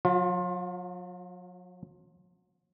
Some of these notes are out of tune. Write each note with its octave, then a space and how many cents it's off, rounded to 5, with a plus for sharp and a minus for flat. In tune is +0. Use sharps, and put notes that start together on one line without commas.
F#3 -35 F4 +25